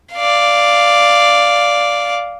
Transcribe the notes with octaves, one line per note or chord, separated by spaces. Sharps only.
D5 F5